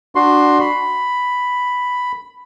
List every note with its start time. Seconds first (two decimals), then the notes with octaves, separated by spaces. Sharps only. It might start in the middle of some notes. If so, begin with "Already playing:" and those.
0.15 D4 F#4 C6
0.61 B5